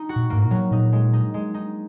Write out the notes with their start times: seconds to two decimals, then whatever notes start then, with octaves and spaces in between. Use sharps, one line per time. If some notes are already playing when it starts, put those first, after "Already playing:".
Already playing: D#4
0.09 F#4
0.16 A#2
0.30 G#2 A#3
0.44 A#2
0.51 F#3
0.71 A#2 D#4
0.93 G#3
1.13 D#4
1.34 G#3
1.54 D#4